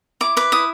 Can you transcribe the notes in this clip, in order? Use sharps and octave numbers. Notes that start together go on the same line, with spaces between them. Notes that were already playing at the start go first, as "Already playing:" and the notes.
E4 D6
B4 D6
E4 D#6